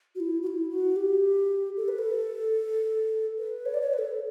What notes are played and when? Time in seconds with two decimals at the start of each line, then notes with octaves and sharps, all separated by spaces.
0.15 F#4
0.20 E4
0.42 F#4
0.47 E4
0.70 F#4
0.96 G4
1.77 A4
1.88 B4
1.99 A4
3.38 B4
3.66 C#5
3.74 D5
3.81 C#5
3.93 B4
3.98 A4